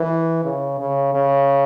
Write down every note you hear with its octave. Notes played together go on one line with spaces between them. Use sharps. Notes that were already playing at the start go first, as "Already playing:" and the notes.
Already playing: E3
C#3
C#3
C#3